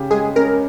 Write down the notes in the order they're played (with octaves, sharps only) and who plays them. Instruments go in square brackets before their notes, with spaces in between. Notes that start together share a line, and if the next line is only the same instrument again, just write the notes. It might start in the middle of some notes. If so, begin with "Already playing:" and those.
Already playing: [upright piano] C#3 G4
[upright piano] G#3 [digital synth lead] G#4
[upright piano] C#4 [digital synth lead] A#4